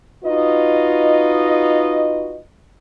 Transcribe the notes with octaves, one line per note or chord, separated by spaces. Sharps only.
D#4 F4 F#4 B4 D#5